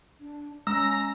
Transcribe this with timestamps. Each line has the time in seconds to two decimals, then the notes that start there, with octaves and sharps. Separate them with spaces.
0.20 D4
0.67 G#3 C#4 A#5 E6